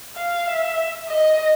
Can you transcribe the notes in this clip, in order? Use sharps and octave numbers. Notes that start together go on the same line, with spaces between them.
F5
E5
D#5